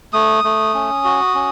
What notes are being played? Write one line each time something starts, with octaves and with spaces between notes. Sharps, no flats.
A3 D#6
A3
C#4
F#4
C#4